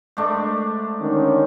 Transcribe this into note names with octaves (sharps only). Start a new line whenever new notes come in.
G#2 A3 D4
D3 D#3 C#4